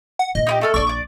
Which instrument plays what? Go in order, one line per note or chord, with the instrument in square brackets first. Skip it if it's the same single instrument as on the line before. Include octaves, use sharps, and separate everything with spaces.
[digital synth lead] F#5
[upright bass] A#2 A#3 [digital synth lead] D#5
[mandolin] D#4 E4 G4
A3 A4 F6
[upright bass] A#1 D4 [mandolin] A4 D5 [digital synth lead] C#6
[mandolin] D5 D6